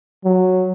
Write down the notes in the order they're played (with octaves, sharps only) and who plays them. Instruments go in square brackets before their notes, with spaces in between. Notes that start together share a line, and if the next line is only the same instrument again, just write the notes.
[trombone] F#3